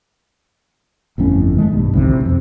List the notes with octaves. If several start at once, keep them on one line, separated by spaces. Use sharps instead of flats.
G1 F2 A2 C#4
D#3 G#3 A3
B1 G2
A1 D2 C3 D#3
F2 C3